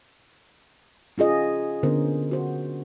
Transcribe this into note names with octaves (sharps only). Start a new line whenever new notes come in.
C#4 F4 G#4 D#5
D3 B3 C#4 A#4 C5
F#4 C5